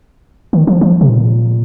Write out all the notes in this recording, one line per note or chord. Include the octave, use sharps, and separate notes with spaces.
D#3
F3
F3
C3
A#2